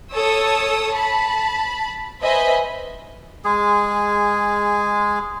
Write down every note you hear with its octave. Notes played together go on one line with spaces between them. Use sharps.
A4 C#5 D#6 E6
A5 B5
B4 C5 D#5 E5 G#5 B5
G#3 G#4